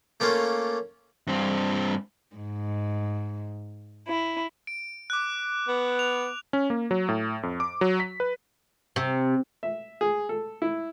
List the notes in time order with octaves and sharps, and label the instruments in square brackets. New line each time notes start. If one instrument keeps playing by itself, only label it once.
[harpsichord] A3 A#3 C#4 F4
[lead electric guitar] G2 C4
[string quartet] G#2
E4
[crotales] D7
D6 F#6
[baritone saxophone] B3
[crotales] F7
[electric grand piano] C#4
A#3
F#3
A2
F2
D6
F#3
B6
B4
[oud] C3
[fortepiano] E5
G#4
A4
E4